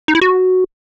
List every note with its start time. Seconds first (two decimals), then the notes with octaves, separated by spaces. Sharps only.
0.08 D#4
0.15 E4
0.21 F#4